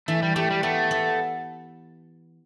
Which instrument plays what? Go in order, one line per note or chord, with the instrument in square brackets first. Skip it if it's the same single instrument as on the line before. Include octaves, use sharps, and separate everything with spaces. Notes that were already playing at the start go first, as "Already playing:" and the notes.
[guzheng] E3 [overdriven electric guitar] A3
[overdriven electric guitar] G3
[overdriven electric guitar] A3 [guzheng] G4
[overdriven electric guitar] G3
[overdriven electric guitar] A3 [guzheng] B3
[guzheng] B3